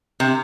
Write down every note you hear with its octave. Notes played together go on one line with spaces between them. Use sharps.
C3